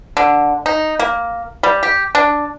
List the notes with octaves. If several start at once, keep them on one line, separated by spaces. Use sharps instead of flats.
D3
D#4
A#3
G3
G4
D4